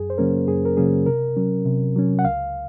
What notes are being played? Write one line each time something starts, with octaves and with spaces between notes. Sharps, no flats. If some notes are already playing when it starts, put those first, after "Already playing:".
Already playing: F#2 G#4
C5
C#3 F#3 A#3 C#4 A#4
F#2 G#4
A#4
C#3 F#3 A#3 C#4 G#4
C3 A#4
F#3 C#4
C3
F#3 C#4
F#5
C#2 F5